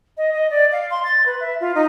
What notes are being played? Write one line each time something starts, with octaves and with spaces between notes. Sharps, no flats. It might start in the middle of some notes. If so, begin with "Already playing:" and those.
D#5
D#5
D5
F5
C6
A6
B4
E5
F4
D#4